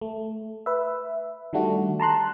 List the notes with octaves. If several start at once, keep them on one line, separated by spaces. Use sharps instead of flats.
A3
B4 E5
D#3 G3 A3 D4 F#4
A5 A#5 C6 F#6